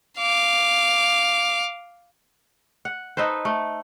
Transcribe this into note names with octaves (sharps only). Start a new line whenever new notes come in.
F5 D6
F#5
D#4 A4 B4 C5
A3